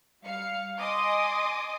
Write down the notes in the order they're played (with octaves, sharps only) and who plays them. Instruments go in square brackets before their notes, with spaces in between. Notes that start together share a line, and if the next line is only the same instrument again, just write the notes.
[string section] G3 F5 C#7
D#5 G#5 C6 D6 D#6